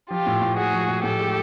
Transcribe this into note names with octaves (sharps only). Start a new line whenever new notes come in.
F3 F4 G4
A2
A2
G#3 F#4 G#4
F3
A2
A2 G4 A4
G#3